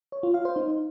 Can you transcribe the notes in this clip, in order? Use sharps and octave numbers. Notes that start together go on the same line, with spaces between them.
C#5
F4
F5
C5
D#4